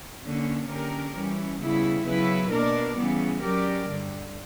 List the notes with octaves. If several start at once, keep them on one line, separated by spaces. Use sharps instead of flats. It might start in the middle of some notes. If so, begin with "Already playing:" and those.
D3 A#3 C#4
D3 A#3 C#4 G4 A#4
E3 G3 C#4
C#3 G3 B3 E4
C#3 F#3 B3 E4 B4
B2 A#3 D4 A#4 D5
C#3 E3 G3 B3
F#3 C#4 G4 A#4 D5
G2 D3 G3